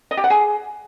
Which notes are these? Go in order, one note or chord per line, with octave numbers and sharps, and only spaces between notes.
D#5
G4
F#5
G#4